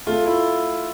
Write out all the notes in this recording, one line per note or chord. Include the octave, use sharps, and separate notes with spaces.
A3 F4
E4